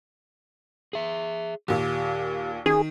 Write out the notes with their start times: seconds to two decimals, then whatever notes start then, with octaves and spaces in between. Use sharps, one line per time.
0.93 G#4 E5
1.68 D#2 A#2 G4
2.66 D#3 G#4